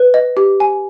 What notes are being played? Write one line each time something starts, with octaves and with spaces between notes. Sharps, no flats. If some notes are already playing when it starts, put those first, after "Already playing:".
Already playing: B4
D#5
G4
G#5